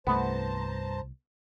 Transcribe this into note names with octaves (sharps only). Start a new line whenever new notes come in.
C2 G2 A3 B3 C5 A5 A#5